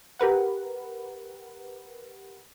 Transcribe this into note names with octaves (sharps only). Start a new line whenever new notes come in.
G4 A#4 B4 F#5